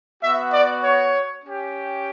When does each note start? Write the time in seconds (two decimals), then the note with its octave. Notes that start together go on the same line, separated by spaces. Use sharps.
0.22 B3 F#4 E5
0.53 D5
0.83 C#5
1.43 C#4 G4